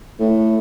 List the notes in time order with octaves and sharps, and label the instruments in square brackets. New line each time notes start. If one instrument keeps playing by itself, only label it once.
[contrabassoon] A2